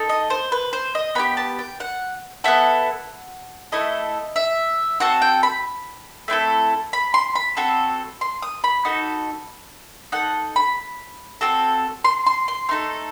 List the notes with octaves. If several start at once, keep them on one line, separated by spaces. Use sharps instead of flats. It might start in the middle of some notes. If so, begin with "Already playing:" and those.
Already playing: D#4 A4
D#5
C5
B4
C5
D#5
B3 E4 G4 B5
A5
G5
F#5
B3 E4 A4 F#5
A3 E4 A4 D#5
E5
C4 F#4 A4 F#5
G5
B5
A3 C4 E4 A4
B5
C6
B5
C4 F#4 A4
C6
D#6
B5
D#4 F#4 A4
D#4 A4 F#5
B5
C4 F#4 A4
C6
C6
C6
A3 D#4 A4 C6